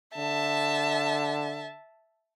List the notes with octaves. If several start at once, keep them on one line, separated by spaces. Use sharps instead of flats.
D3 E5 A5